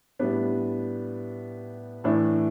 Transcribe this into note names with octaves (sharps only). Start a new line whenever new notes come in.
A2 G3 B3 D4
A2 E3 A3 D4